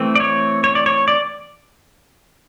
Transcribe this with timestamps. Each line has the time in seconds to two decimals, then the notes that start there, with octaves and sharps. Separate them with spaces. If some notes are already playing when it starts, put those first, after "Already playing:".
Already playing: E3 A3 C4
0.15 D5
0.20 C#5
0.64 C#5
0.75 D5
0.86 C#5
1.08 D5